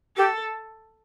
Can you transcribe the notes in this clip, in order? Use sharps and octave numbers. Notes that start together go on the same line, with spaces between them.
G4 A4